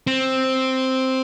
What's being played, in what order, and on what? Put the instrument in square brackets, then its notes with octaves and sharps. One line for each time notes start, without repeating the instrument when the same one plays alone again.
[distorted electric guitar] C4